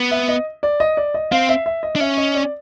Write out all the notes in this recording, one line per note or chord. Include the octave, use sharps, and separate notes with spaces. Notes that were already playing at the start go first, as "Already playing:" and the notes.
Already playing: B3
E5
D#5
D5
D#5
D5
D#5
C4 F5
E5
E5
D#5
D4
C#4 E5
D#5
D5